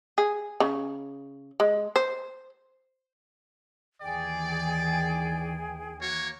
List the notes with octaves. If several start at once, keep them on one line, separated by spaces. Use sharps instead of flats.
G#4
C#3
G#3
C5
D#2 D#3 E3 G#4 D5 G5 G#5
A#3 F#4 C#5